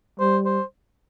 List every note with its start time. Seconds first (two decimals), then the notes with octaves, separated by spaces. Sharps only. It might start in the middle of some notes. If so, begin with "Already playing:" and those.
0.20 G3 C5
0.45 C5